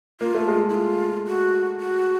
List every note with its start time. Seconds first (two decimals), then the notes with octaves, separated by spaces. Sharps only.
0.21 A#3 F4
0.35 A3
0.48 G#3
0.69 E4
0.74 F4
1.27 F#4
1.80 F#4